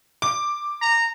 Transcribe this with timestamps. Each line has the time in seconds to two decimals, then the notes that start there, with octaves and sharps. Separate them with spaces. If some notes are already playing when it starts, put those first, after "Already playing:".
0.22 D6
0.82 A#5